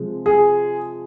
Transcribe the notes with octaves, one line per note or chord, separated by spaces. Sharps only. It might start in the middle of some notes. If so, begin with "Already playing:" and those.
Already playing: C3 F3 G#3
G#4